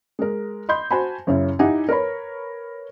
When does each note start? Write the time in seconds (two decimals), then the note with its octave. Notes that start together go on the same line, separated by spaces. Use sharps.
0.19 G#3 A#4
0.69 D#5 B5 C6 G6
0.91 F#4 C5 G#5 A5 B5
1.27 F#2 C#3 C#4 E4
1.59 D#4 E4 G4 F#5 G#5
1.89 A#4 B4 C#5 B5